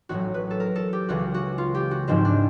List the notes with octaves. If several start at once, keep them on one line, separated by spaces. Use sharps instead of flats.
A1 A2 F#3 F#4
B4
A4
A#4
A4
G4
C#2 C#3 E3 F#4
F#4
F4
G4
F#4
G#1 G#2 F3 C4
D4